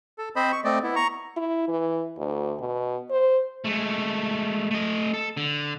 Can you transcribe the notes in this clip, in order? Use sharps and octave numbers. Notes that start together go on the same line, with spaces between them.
A4
C4 C5 D#5 B5
C#6
A3 C4 D5 D#5
B3 E4
A#5 C#6
E4
E3
D2
B2
C5
G#3 A3
A3 D#5
A4
D3